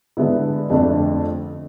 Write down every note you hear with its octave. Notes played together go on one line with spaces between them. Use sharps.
D3 G#3 B3 E4
F2 D3 A3 D4